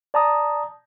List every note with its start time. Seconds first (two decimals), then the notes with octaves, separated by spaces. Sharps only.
0.14 D5 A5 A#5 D#6